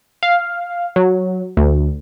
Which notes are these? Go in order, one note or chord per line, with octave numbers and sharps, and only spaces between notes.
F5
F#3
D2